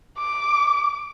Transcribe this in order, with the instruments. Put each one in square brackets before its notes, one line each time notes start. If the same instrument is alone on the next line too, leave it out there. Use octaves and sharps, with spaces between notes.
[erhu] D6